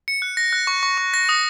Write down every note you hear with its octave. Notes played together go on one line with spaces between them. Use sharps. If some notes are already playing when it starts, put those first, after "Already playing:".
C#7
F#6
A#6
F#6
C#6
C#6
C#6
A#6
D#6